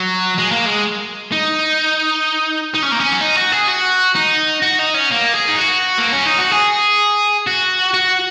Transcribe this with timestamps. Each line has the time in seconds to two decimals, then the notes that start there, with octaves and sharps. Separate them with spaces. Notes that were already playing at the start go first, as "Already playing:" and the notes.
Already playing: F#3
0.38 G#3
0.51 A#3
0.66 G#3
1.32 D#4
2.75 D#4
2.83 C#4
2.92 A#3
3.00 C#4
3.12 F#4
3.21 D#4
3.37 F#4
3.52 G#4
3.68 F#4
4.15 D#4
4.62 F#4
4.79 D#4
4.94 C#4
5.11 A#3
5.34 G#4
5.48 D#4
5.57 F#4
5.98 A#3
6.12 C#4
6.25 D#4
6.38 F#4
6.51 G#4
7.47 F#4
7.94 F#4